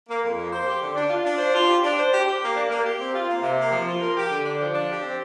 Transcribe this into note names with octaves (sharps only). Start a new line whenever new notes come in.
A#3
F2
A#3
C5
G4
D3
D4
F4
D4
C5
F4
G4
D4
C5
G4
G4
A#3
D4
A#3
G4
C4
F4
A#3
C3
A#3
F3
F4
A#4
G4
D3
D4
F3
D4
G4
C4